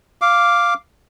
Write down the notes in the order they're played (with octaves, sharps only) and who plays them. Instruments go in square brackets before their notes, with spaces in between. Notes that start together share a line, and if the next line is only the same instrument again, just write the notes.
[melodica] F5 D6